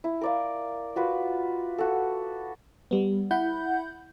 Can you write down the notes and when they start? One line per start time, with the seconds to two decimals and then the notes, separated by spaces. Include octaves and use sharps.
0.04 E4
0.21 A#4 D5 F5
0.96 F4 F#4 B4
1.78 F#4 A4
2.91 G3 B3
3.31 E4 F#5 B5 G6